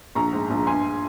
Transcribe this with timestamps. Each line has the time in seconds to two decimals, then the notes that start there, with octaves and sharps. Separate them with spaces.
0.15 A#1 A#5 C#6
0.33 G#2
0.50 A#1
0.67 G2 G#5 C6